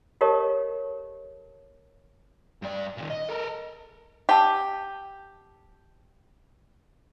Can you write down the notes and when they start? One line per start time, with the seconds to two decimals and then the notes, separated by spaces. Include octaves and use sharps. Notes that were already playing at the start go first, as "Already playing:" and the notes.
0.21 G4 A4 A#4 C#5 D#5 A5
2.62 G2 D5
2.97 D#2 A#2
3.10 D#5
3.29 A4 A#4
4.29 G4 F#5 A5 E6